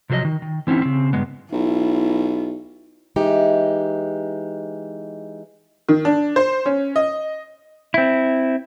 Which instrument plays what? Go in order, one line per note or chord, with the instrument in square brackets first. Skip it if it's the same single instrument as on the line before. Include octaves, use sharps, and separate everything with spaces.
[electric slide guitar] C3 F3 F#3 C5 D#5
D#3
D#3
E3 C4 C#4 D#4 E4
C#3 C4
G2 A#2 C#3 G#3 B3
[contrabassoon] B1 [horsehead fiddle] E4 F4
[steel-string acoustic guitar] E3 G#3 D#4 G4
[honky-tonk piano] D#3
D4
C5
C#4
D#5
[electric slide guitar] C4 E4